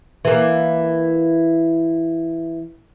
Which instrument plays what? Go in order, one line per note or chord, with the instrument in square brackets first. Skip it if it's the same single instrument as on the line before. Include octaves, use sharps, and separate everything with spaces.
[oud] E3 A#3